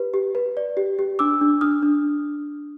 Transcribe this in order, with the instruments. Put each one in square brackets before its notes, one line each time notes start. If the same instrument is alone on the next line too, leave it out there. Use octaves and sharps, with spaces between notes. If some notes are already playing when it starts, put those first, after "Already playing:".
Already playing: [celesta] G4 B4
G4
B4
D5
G4
G4
D4 D6 E6
D4
D4 D#6 F6
D4